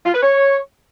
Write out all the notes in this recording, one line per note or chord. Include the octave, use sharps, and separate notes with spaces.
F4
B4
C#5